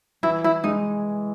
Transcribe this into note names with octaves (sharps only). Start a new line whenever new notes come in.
E3 E4
E4
G#3 D#4